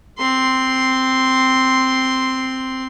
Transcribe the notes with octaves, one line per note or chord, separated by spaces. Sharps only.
C4 C6